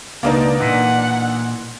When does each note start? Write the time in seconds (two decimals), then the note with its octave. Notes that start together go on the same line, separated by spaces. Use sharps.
0.23 C#2 B2 A#3 B3 D4 D#4 D#5
0.60 A#2 E3 F#5